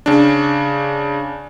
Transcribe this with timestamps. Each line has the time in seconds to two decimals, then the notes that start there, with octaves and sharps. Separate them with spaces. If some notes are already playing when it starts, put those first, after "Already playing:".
0.06 C#3 D4